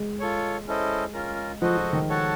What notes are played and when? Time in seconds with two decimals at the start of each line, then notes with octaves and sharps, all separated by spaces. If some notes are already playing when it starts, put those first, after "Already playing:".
Already playing: G#3
0.20 F4 A4 C#5
0.67 C#4 E4 A4 C5 D#5
1.14 C#4 F4 A#4
1.61 F3 F#4 A4 C5 D#5 F#5
1.77 F3
1.93 D#3
2.09 F#4 A4 C#5 F#5 A5